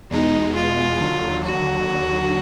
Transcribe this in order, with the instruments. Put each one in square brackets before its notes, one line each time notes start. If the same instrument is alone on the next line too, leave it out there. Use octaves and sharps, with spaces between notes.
[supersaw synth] E2 B2 G#3 [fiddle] D#4
[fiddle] F4
[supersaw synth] D#2 D3 F#3
[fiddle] F#4